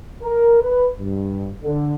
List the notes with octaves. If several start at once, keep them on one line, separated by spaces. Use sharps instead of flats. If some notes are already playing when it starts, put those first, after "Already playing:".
A#4
B4
G2
D3